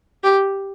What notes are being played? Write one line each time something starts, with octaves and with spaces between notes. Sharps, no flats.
G4